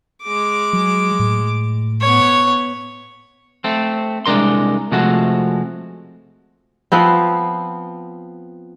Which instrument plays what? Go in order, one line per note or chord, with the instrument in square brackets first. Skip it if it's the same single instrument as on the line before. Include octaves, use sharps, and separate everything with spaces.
[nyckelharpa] G#3 D6
[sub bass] F#3
A2
[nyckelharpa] B3 C#5
[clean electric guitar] A3 C4
C2 G#3 D4 A#4 C6
C3 F3 G#3 A3 F#4
[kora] F3 B3 C4